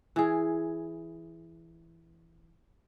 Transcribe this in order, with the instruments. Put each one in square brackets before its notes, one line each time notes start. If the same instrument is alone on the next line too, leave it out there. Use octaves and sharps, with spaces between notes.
[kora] E3 G#4